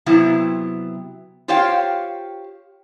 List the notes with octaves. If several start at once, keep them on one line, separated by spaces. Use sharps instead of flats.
C3 F#3 B3 E4
F4 G4 C5 C#5 F5 G5